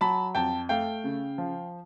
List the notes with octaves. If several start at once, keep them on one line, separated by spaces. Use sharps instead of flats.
F#3 A5 B5
F2 G5 A5
A3 F5 G5
C#3
F3